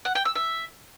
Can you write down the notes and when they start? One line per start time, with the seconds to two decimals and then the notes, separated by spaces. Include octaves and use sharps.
0.05 F#5
0.15 G5
0.25 E6
0.35 E5